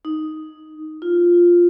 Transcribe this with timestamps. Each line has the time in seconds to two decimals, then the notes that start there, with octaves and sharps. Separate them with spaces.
0.05 D#4
1.02 F4